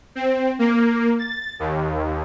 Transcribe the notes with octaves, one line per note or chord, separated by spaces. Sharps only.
C4
A#3
A6
D#2